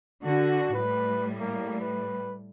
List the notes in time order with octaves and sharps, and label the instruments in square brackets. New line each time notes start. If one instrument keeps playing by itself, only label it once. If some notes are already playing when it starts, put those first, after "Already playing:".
[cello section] D3 F#4 [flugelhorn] D4
[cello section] A2 G3 [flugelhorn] B4
[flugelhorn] A#3
B4